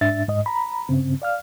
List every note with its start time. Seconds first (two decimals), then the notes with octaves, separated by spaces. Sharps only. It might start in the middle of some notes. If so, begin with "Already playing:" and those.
0.01 G#2 D4 E5 A6
0.28 G#2 D#5
0.46 A#5 B5
0.89 G2 C#3 C4
1.22 D5 F5 F6